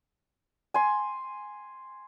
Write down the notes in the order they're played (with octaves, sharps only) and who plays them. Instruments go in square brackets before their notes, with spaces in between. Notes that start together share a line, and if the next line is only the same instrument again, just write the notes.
[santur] G#5 C6